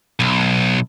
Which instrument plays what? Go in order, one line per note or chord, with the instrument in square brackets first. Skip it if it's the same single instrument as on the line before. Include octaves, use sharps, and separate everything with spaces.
[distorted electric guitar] B1